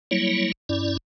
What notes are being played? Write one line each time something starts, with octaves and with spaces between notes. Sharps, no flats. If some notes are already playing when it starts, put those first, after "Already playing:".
F#3 G3 A#3 E4 C#5
G2 C#4 E4 D5